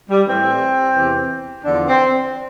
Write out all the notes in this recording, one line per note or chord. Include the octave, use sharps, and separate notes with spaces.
G3
A2 E3 C4
E2 C3 E3
E2 D3 F3 D4
C4